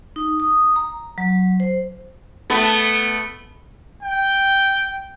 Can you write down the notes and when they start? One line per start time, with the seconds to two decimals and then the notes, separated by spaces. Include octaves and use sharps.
0.16 D#4
0.40 D#6
0.76 A#5
1.18 F#3
1.60 C5
2.50 A3 B3
4.03 G5